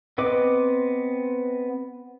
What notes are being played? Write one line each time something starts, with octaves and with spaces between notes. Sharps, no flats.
B3 C4 B4 D#5 D6